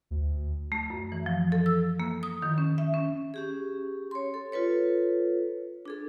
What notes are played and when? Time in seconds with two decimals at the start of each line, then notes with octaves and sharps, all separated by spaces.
0.11 D2
0.72 A3
0.90 F#2
1.12 E3
1.26 F3
1.52 A4
1.66 E6
2.00 A#3
2.23 D#6
2.42 D#3
2.58 C#4
2.78 E5
2.94 C#4
3.34 C#4 G4 G#4
4.11 C#5 C6
4.34 A4
4.52 F4 A4 B4 C#5
5.85 D4 G#4 A4